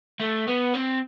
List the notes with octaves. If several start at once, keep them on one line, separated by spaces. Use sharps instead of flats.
A3
B3
C4